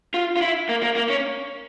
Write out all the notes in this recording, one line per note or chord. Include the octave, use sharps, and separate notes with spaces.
F4
F4
E4
A#3
A#3
A#3
C#4